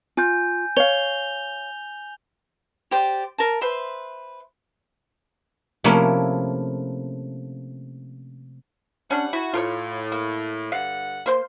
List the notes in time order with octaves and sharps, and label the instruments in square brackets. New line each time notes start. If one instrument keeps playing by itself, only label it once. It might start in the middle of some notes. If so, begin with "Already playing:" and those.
[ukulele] F4 [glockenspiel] G#5 G6
[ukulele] C#5 F5 [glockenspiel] F7 G7
[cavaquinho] G4 C5 D5
A#4 A5
B4 C5 E5 C6
[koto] C3 F3 A3 A#3 C#4 E4
[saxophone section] G3 F#5 [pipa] C#4 D4
[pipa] E4 [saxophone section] F#4
[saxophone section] A2 [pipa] F4 A#4 C#5
[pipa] A#3
[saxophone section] G2 D3 F#5 [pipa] F5
[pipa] A#3 C5 C6